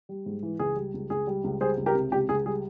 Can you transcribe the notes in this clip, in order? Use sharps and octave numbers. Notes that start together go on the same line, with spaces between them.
G3
G#2
E3
C#2 G#4
G3
C#2
C#2 G#4
G3
C#2
G3 G#4 C5
C#2
G4 A#4
C3
C#2 G4
C#2 G#4
G3 G#4